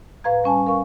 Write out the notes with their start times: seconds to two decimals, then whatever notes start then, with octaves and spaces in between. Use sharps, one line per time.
0.24 A2 B4 F5 A#5 G#6
0.44 G3 C#4 G#5 A5
0.66 A#4 F5 C#6